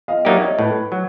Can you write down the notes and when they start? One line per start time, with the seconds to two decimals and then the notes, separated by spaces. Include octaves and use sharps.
0.08 D#5 F5
0.25 F#3 A#3 D#4 G4 D5 E5
0.41 C#5 D#5
0.59 A2 B4
0.92 F#3